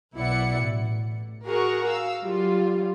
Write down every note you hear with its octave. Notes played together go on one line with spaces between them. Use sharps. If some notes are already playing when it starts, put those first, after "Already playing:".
B1 B2 E4 D5 F#5 C#7
A1
F#4 G#4 A#4 F#5 A#5 C#6
F5 E6
F#3 G3 F4